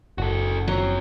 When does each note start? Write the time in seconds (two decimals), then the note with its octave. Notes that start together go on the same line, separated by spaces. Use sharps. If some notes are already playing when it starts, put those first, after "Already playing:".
0.18 F#1 F#4 A4
0.68 F3 F#3 C4